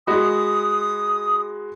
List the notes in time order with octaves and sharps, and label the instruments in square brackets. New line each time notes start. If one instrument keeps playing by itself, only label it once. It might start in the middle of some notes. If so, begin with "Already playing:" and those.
[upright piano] G#3 F#4 B5 [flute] D#6